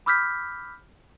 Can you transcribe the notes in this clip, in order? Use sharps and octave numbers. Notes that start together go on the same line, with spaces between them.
B5 D6 E6 F6 G6 B6